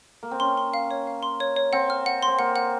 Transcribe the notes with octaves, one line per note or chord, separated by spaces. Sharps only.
A#3
C4
C#4 C6
C6
F5
C#5
F5
C6
C#5
C#5
C4 F#5
F6
F#5
C6
C4
A#3 F#5
F#5